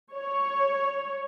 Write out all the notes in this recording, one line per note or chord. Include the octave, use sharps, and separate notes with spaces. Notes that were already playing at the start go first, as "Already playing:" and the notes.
C#5